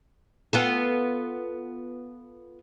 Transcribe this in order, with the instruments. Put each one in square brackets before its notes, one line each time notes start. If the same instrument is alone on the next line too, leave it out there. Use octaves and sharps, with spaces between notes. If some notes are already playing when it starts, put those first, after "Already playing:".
[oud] B3 F4 A4